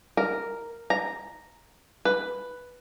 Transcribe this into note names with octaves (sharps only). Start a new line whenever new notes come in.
A#4
A#5
B4